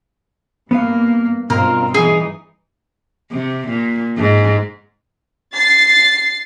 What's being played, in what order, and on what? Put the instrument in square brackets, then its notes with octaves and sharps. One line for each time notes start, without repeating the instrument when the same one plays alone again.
[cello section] G2 A#3 [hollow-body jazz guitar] B3 B4 F5
[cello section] G2 C4 F4 [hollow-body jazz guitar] B2 [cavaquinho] A#4
[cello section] E3 G3 D#4 [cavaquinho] G#4
[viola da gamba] C3
A#2
G#2
[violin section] A6 C7